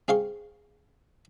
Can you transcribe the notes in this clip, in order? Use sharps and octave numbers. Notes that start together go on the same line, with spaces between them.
C4 G#4 F5 C6 C#6